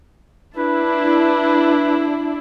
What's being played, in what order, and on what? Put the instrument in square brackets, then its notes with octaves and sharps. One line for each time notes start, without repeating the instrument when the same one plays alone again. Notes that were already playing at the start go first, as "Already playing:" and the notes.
[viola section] D4 E4 [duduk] B4